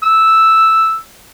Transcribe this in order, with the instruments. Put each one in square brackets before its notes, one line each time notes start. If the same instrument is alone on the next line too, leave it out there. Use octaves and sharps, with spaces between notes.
[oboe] E6